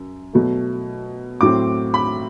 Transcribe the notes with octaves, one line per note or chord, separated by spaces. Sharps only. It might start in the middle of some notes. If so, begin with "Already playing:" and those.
Already playing: F#2
B2 F#3 A3
A2 F#3 C4 D6
B5